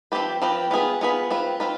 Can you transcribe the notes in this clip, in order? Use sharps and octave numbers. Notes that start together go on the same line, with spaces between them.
F3 C4 G4 B4
F3 C4 G4 B4
B3 F4 G#4 B4
B3 F4 G#4 B4
C4 F4 B4
C4 F4 B4